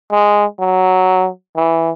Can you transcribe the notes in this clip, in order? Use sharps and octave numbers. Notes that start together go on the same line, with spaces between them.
G#3
F#3
E3